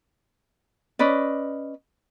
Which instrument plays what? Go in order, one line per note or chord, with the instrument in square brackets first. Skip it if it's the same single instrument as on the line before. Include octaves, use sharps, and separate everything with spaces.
[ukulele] C#4 B4 D5 D#5